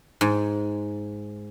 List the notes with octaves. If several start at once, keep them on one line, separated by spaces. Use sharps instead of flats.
G#2